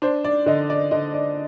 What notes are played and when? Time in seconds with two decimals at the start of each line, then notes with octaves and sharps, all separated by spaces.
0.02 D4 C5
0.24 D5
0.46 D3 D#5
0.70 D5
0.91 D3 D#5
1.13 D5